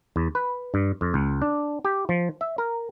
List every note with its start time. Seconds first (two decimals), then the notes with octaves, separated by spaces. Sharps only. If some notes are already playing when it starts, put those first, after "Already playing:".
0.16 E2
0.35 B4
0.74 G2
1.01 F2
1.14 C#2
1.42 D4
1.85 G4
2.09 F3
2.41 E5
2.58 A#4